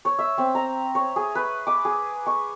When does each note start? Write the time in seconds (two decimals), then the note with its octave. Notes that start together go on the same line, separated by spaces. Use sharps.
0.05 C#5
0.19 E5
0.38 C4
0.55 A#5
0.95 C#5
1.16 G#4
1.35 B4
1.67 D6
1.85 G#4
2.26 C#6